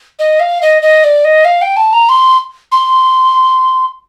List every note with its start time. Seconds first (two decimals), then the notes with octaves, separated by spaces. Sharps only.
0.19 D#5
0.40 F5
0.62 D#5
0.82 D#5
1.04 D5
1.25 D#5
1.45 F5
1.62 G5
1.77 A5
1.93 A#5
2.09 C6
2.72 C6